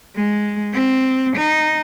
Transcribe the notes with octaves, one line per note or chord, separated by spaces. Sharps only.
G#3
C4
D#4